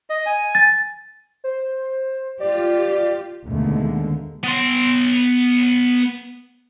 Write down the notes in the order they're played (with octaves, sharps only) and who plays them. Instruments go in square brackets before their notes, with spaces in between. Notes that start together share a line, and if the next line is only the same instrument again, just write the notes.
[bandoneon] D#5
G#5
[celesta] A6
[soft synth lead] C5
[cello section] F4 G4 [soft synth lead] D5
[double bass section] D#2 B2 D3 G#3 A3
[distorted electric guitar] B3 C6